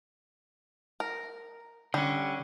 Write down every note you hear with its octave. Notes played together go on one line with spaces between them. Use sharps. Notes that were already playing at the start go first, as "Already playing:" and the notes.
A#4
D3 G3 C#4